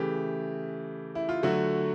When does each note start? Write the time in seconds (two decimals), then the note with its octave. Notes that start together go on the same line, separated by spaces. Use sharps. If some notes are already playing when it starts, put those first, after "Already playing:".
Already playing: C#3 E3 A3 G4
1.15 E4
1.29 F4
1.43 D3 F#3 A3 F#4